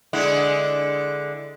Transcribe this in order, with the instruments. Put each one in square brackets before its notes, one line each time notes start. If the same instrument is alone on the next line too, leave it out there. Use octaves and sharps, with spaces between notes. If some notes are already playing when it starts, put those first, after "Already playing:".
[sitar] D3 G#3 E4